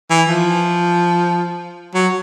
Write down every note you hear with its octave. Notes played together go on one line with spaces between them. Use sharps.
E3
F3
F#3